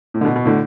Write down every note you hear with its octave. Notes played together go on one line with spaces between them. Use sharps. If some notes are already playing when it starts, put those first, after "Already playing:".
A2
D3
B2
B2
A2 D3